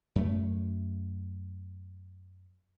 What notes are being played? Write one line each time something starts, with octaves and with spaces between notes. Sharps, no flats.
F#2 A3